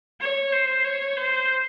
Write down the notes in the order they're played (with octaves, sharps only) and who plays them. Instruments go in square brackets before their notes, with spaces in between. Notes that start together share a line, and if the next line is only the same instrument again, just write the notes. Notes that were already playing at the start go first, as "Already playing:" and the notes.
[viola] C#5
C5
C#5
C5